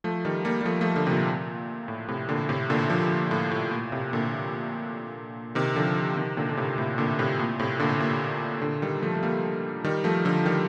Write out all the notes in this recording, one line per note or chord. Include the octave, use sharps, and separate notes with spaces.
F3 A3
D#3 G3
G3 A#3
G3
F3 A3
F3 A3
D3 F3
C3
A#2
A2
A2 C3
A#2 D3
A2 C3
A#2 D3
D3 F3
A2
A2
A#2
A2 C3
A#2 D3
C3 D#3
D3 F3
C3 D#3
A#2 D3
D3
A2 C3
A2 C3
A#2 D3
A2 C3
A#2
A2 C3
A#2 D3
A#2
A#2 D3
D#3 G3
F3 A3
A3
G3 A#3
D#3 G3
F3 A3
D3 F3
D#3 G3